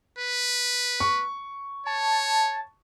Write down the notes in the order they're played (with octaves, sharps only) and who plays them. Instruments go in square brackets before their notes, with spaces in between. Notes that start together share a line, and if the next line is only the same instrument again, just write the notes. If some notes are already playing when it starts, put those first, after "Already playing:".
[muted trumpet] B4
[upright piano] C#6
[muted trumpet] C#5 [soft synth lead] A5